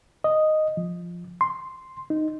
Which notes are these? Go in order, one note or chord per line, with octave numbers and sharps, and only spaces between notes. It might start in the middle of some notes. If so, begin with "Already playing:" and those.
D#5
F3
C6
D#4